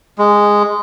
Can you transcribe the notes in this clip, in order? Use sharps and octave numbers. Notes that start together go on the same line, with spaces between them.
G#3